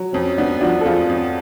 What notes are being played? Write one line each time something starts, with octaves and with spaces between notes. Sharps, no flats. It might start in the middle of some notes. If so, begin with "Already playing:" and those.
Already playing: F#3
F2 C#4
B3 D4
F3 D4 F#4
A4
F2 F4 G#4
F2